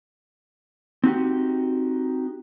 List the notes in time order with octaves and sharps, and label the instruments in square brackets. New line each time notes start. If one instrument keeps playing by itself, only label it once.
[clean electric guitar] C4 D#4 F#4 G4